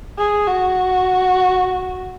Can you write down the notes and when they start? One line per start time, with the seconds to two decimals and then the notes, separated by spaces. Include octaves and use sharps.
0.19 G#4
0.47 F#4